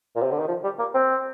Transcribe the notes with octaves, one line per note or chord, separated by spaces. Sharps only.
A#2
C3
D3
D#3
F3
G3
A#3
C4